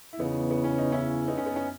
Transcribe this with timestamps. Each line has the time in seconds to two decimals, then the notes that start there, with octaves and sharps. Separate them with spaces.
0.13 E4
0.19 E2 C#3 E3 B3 D#4
0.51 B3
0.64 C#4
0.78 D#4
0.92 C#4 E4
1.28 B3 D#4
1.38 C#4
1.46 B3
1.56 C#4